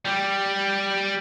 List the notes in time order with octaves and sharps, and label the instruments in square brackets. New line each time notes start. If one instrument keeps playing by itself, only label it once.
[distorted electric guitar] G3